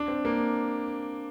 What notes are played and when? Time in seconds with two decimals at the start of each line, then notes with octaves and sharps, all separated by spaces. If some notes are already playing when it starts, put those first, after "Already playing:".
Already playing: D4
0.08 C4
0.25 A#3